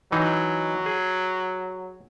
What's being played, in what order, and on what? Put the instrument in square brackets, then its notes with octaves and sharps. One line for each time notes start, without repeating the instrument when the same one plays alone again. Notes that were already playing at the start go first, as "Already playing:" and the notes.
[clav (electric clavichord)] E3 D#4 [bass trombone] F#3
[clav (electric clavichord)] G#4